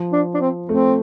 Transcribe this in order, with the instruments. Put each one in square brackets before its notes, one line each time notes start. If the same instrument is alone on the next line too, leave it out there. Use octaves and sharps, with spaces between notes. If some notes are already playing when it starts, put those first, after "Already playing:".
Already playing: [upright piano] F3
[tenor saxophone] D4
D4
C4
[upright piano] A3 [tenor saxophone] C4